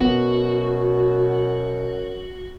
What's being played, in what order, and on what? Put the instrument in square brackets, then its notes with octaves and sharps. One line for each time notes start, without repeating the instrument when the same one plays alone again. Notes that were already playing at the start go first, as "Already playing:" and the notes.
[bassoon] F#2 [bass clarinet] B2 [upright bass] B3 [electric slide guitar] F#4